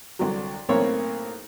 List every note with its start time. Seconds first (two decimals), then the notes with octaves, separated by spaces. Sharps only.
0.19 C2 D3 F#3
0.69 B1 A2 A#3 C4 E4 C#5